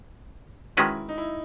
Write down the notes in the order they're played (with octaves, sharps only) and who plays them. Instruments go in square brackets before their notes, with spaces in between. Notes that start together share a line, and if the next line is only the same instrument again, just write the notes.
[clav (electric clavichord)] D#3 G#3 C#4 F#4 B4 [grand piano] E4
[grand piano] D#4
E4